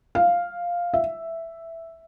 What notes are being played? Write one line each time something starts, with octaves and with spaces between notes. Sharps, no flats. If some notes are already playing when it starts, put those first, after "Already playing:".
F5
E5